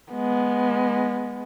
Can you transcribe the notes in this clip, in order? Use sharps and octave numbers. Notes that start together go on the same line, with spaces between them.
G#3 B3